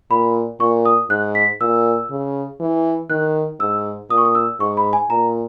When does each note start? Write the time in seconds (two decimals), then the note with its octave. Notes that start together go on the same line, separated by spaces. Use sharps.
0.11 A#2 B5
0.60 A#2 C#6
0.85 D#6
1.10 G#2 F#6
1.35 B6
1.61 A#2 E6
2.11 C#3
2.60 E3
3.10 D#3 F#6
3.60 G#2 E6
4.10 A#2 D#6
4.18 C#6
4.25 D#6
4.35 E6
4.60 G#2 C#6
4.77 B5
4.93 G#5
5.10 A#2 A#5